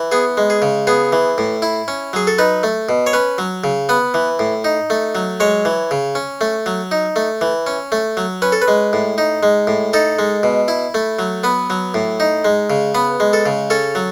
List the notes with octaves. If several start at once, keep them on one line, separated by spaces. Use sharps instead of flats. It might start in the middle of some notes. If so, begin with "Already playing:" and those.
Already playing: E3
B3 G#4
G#3
G#4
C#3
B3 G#4
E3
A2
E4
C#4
F#3 G#4
A4
D#4 B4
A3
B2
C#5
C#4 B4
F#3
C#3
B3 B4
E3
A2
D#4
A3
F#3
G#3 C#5
E3
C#3
C#4
A3
F#3
D#4
A3
E3
C#4
A3
F#3
C#4 B4
A4
B4
G#3
A2
D#4
G#3
A2
D#4 A4
G#3
B2
E4
A3
F#3
B3 B4
F#3
A2
D#4
G#3
C#3
B3 B4
G#3
A4
C#3
C#4 A4
F#3